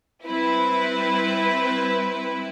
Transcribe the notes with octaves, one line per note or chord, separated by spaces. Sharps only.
G3 C4 E4 B4